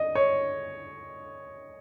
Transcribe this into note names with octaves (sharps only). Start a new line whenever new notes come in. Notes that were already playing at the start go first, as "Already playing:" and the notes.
Already playing: D#5
C#5